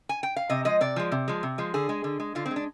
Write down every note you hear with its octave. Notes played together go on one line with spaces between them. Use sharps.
G#5
G5
F5
C3 D#5
F3 G#3 D#5
C3 D5
F3 G#3
C3
F3 G#3
C3
F3 G#3
D3 G#4
G#3
D3
G#3
D3 F4
C4
G#3
D4